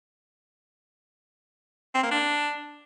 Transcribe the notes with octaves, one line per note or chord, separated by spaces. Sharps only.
C4
A#3
D4